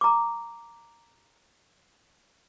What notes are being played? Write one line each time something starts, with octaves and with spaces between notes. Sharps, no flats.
A#5 D6